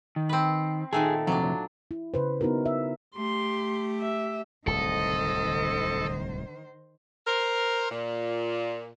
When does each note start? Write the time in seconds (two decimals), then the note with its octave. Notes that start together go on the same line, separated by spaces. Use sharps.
0.16 D#3
0.29 C4 B4
0.93 A#2 D#3 A3 G#4
1.27 F2 C3 E3 F#3 D4
1.91 E4
2.14 C#3 B4 C5
2.41 B3 D#4 E4 F#4 A#4
2.66 E5
3.16 A3 G4 C6
4.01 E5
4.67 D1 C2 D#3 A4 C5 D#5
7.27 A#4 C5
7.91 A#2